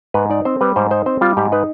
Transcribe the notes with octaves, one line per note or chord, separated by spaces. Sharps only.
G#2 B4
D#4 D5
C4 C5
G3 B4
G#2 C5
D#4 C5
C4 C5
G3 F4
G#2 G4
D#4 B4